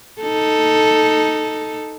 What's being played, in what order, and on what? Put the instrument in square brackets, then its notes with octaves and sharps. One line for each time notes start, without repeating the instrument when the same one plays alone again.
[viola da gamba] D#4 A4